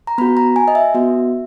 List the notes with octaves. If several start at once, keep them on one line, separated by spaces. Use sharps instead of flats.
A#5
B3 F#4 B5
A#5
G#5
D#5
E5
B3 F#4